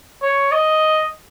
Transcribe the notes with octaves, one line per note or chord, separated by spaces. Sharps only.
C#5
D#5